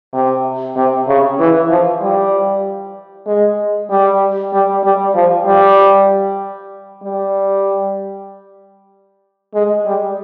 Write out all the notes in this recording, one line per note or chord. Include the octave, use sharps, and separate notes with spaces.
C3
C3
C#3
E3
F3
G3
G#3
G3
G3
G3
F3
G3
G3
G#3
G3